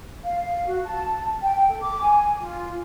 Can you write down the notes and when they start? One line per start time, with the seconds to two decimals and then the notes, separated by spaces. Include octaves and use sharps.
0.23 F5
0.67 F#4
0.84 A5
1.42 G5
1.69 A4
1.81 D6
2.02 G#5
2.41 F4